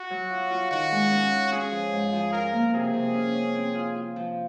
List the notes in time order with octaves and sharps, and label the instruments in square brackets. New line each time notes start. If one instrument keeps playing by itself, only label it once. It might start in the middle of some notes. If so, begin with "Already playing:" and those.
Already playing: [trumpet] F#4
[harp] F#3
F4
F4
[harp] D#3 [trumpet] F#4
[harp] G#3
C#4
F4
[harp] C#4 [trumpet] G#4
[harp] F3
G#2
F3
[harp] F4 [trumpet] A#4
[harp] A#3
[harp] C3 [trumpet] G#4
[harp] C3
C#4
C#4
C4
F4
F4
F3